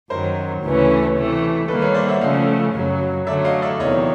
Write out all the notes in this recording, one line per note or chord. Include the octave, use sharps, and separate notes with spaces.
F#2 D#3 F#3 A#4 C5
D2 C#3 E3 A3 C#4
C3 E3 A3
D#3 G3 A#3 A4 B4
B4 C#5
C5 D5
E5 F#5
C#3 F3 A3 C#4 D#5 F5
F#2 C#3 F#3
D3 F#3 A3 D5 E5
D#5 F5
D5 E5
E2 C3 D#3 F#3 C#5 D#5